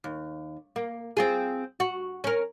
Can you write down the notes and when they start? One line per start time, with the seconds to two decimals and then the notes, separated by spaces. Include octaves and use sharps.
0.04 D#2
0.76 A#3
1.17 C4 F4 G#4
1.80 F#4
2.24 C#4 A#4